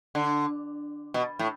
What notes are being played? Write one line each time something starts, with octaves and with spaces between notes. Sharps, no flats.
D3
B2
A2